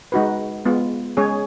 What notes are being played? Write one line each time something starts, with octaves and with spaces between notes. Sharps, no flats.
G#3 D#4 F#4 B4
G#3 B3 F4
G#3 C#4 G#4 C#5